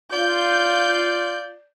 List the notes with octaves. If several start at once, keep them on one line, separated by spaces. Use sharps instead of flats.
F4 D5 G6